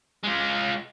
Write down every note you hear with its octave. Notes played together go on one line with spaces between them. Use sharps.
G#3 F4